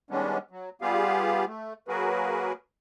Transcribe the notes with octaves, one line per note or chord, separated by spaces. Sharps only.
D#3 G3 G#3 B3 C#4 D4
F#3
G3 B3 F4 G4 G#4 F5
A3
F#3 A#3 F#4 G#4 A#4 B4